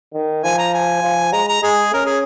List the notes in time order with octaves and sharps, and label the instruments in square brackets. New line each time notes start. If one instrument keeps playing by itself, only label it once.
[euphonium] D#3
[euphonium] F3 [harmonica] G#5
[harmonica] A#5
G#5
[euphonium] F3
[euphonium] G#3 [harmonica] A#5
[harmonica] A#5
[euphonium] G#3 [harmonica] G#4
[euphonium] C#4 [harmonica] A#4
[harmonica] G#4